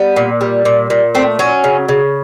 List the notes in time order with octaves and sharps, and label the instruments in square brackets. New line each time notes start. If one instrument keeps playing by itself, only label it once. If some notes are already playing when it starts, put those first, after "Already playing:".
Already playing: [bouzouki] G3 B3
A#2
G3
A#2
A#2
A3 C4
F#3 C#4
C#3
C#3